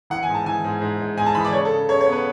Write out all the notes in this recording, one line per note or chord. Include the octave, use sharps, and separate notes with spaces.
E3 F#5
G#5
G#2
A5
E3 G#5
G#2
G#2
G#2
G#2 G#5
A5
E3 B5
D5
C#3 C#5
A4
C#3
C#3 C#5
C#5
B3
B4